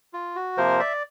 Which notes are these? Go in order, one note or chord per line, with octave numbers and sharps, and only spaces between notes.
F4
F#4
C3 F3 A#3 A#4 C5
D5 E5